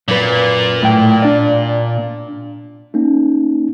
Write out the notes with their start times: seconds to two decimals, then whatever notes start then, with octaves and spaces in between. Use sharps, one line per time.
0.08 F#2 A#2 B4
0.83 A2 G5
1.22 D4 D5
2.94 A#3 C#4 D#4